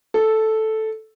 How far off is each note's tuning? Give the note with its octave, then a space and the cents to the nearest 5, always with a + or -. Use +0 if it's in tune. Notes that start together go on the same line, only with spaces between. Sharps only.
A4 -5